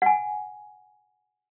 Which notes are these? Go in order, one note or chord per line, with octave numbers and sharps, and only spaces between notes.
F#5 G#5